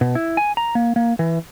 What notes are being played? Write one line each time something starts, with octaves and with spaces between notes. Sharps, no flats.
B2
E4
G#5
A#5
A#3
A#3
E3